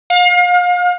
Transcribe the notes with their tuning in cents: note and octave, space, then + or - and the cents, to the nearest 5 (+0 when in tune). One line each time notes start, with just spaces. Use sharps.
F5 +35